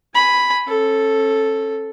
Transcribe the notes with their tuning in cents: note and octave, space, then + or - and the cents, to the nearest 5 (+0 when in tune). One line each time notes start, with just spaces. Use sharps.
G#5 +0 B5 +0
C#4 -35 A4 +0